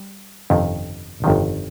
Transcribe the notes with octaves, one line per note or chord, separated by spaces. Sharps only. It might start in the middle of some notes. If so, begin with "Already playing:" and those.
Already playing: G3
G1 F2 C3 D#3
G1 F2 C3 D#3